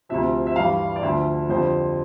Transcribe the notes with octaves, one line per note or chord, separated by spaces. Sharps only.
D2 C3 F3 E5
E5
G2 E3 G3 F5
D5
D2 D3 F3 E5
F2 D3 G3 C5